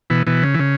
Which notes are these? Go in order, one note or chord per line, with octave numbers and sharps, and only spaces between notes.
B2 E3
B2 E3
C#3
E3
C#3